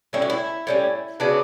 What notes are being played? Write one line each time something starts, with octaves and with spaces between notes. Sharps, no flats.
A2 G3 C#4 E4
F#4
E4
A2 G3 C#4
C#3 F#3 B3 D4